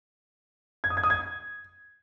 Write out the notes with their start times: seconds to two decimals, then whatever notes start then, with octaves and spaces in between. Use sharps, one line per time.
0.84 G#6
0.90 D#6
0.97 G#6
1.03 D#6
1.10 G#6